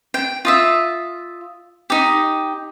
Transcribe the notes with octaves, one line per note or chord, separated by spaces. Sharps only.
G5
F4 D#5 E5
D#4 G4